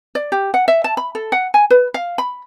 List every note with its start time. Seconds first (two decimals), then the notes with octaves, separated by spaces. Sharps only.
0.15 D5
0.32 G4
0.54 F#5
0.68 E5
0.84 A5
0.97 B5
1.15 A4
1.32 F#5
1.54 G#5
1.70 B4
1.94 F5
2.18 B5